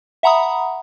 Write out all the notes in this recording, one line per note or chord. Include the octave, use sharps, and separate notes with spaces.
E5 F#5 A#5 B5 D#6